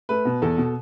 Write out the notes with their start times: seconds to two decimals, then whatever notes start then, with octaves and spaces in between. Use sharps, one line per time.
0.09 A3 B4
0.25 B2
0.42 E2 A4
0.58 B2